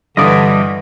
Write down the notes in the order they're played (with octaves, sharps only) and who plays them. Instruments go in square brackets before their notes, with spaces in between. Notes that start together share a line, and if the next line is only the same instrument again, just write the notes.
[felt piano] G2 D#6 [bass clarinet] D3 [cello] E3 [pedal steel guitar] G3 D5 D#5